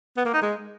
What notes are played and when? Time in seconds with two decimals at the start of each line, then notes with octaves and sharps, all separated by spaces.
0.17 B3
0.26 A#3
0.34 D#4
0.42 G#3